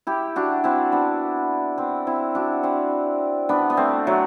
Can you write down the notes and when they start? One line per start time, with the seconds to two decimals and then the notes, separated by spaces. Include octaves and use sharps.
0.07 E4 G4
0.36 D4 F#4
0.64 C4 E4
0.92 B3 D4
1.78 C4 E4
2.07 C4 E4
2.35 D4 F#4
2.63 C4 E4
3.49 B3 D4
3.70 B3
3.77 A3 C4
4.07 F#3 A3